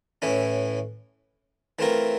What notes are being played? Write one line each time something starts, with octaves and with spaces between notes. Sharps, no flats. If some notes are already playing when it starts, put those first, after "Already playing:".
A2 E3 A3 C#4
E3 A3 C4 F4 A#4